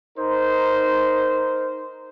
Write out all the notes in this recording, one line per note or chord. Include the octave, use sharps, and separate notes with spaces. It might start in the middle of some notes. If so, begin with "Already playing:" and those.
D#4 A#4 C5